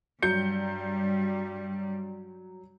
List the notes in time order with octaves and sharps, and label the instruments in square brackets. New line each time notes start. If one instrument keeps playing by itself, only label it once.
[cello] G2 G3 [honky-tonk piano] F#3 G6 C#7